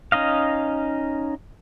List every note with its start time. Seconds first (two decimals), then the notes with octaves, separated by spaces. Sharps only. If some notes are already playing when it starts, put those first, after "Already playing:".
0.12 C#4 D#4 D#5 F5